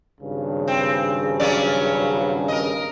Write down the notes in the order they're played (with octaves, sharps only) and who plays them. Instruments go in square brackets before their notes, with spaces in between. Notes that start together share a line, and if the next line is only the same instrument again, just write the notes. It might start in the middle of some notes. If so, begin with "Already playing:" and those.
[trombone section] G#1 G2 C#3
[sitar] C4
F#3 C#4 D5
A#4 D#5